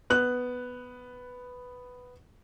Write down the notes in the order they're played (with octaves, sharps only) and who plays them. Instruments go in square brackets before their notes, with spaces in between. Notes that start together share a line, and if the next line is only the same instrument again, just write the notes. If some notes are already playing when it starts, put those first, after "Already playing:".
[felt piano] B3 F#6